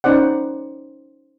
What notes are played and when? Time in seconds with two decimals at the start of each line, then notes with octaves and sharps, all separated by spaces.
0.04 C#4 D#4 C5 D5 F#5